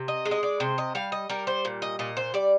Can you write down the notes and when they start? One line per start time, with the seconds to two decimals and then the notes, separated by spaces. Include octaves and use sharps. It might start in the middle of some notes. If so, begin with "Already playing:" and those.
Already playing: C3
0.08 D#5
0.25 G#3
0.31 D#5
0.43 D5
0.60 C3 C5
0.78 D#5
0.95 G3 F5
1.12 D#5
1.29 G3 A#4
1.47 C5
1.65 A#2
1.82 D#5
1.99 A#2 D#5
2.17 C5
2.34 G3 D5